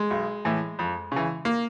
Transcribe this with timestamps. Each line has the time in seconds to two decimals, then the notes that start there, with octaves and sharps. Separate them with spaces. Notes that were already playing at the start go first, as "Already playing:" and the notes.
Already playing: G#3
0.10 B1
0.45 A2 E3
0.79 F2
1.12 C#3 E3
1.45 A#3